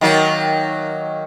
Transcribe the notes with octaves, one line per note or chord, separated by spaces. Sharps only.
D#3 F#3 A#3